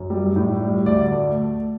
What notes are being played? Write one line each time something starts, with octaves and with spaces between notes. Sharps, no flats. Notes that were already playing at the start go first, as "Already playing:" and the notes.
Already playing: F#2
G3
A2
G3
D2 D5
A3